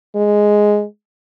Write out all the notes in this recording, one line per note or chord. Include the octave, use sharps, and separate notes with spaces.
G#3